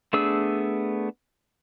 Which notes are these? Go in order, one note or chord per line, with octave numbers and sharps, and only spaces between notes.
A3 B3 D4 G#4 E6